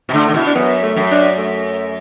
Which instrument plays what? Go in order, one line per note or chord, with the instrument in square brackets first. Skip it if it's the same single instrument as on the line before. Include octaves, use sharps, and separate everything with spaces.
[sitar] B2
[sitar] D3 [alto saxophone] A3
[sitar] D3
[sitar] B2 [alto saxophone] E4
[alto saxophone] D4
[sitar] F#2 [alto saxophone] B3
[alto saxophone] A3
[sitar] F#2
[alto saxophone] D4
A3